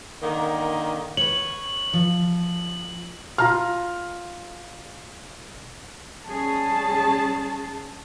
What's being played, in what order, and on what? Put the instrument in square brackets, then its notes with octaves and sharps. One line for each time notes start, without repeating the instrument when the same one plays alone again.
[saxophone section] D3 D#3 A#3
[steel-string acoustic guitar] B4 C#5 [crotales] F#7
[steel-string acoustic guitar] F3
[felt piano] F4 A#5 F6
[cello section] G3 C#4 G#4 [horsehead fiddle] A5